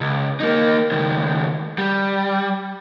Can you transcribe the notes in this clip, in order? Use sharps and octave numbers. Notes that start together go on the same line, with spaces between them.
C#2
A#3 D#4
C#2 D#3
G3